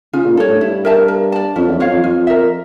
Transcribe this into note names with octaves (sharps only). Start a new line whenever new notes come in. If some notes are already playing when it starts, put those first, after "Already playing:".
C#3 F4
A#2
G2 A4 C#5
A2
G2 E4
A#4 E5 A5
A#4
D5 A5
F2 C#4
E2
F2 F4 C#5 F5
F2
F2 F4
A#4 E5